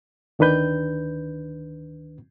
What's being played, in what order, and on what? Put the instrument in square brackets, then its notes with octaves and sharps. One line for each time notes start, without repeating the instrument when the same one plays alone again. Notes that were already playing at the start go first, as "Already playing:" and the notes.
[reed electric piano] D2 D#3 D4 B4 G6